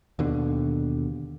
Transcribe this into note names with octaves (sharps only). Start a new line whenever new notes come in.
D#2 B2 D3